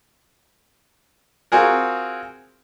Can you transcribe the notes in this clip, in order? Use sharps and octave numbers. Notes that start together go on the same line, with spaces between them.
C4 F4 F#4 G#4 A#4